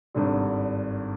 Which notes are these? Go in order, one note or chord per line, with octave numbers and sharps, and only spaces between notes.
G#1 G2 D3